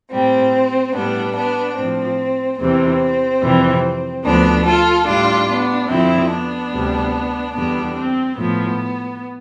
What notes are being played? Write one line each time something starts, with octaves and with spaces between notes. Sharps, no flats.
A2 G3 C4
A2 G3 B3 D4
B3 D4
A2 F3 C4
E2 C3 E3 C4
F2 C3 E3 G3
D2 D3 F3 B3 D4
F4 A4
A2 G3 D4 F4
B3 D4
F2 D3 F3 C4 E4
B3 D4
D2 C3 G3
E2 D3 G3 B3 D4
C4
A2 F3 B3